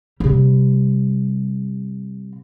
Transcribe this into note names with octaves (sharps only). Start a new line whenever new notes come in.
C3 G3